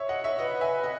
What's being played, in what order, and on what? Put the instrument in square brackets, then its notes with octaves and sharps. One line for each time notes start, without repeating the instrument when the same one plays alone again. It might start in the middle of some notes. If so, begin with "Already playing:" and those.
Already playing: [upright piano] C#5 E5
D#5 F#5
C#5 E5
[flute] B4 [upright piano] D#5 F#5
[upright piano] E5 G#5
D#5 F#5